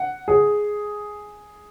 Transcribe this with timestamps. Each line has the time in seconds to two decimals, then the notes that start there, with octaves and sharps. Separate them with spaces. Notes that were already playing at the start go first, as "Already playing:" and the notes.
Already playing: F#5
0.28 G#4